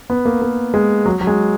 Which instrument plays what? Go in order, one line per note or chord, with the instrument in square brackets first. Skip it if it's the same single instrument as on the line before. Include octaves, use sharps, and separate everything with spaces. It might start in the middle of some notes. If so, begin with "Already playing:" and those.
[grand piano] B3
A#3
A#3
G#3
F#3
F#3
G#3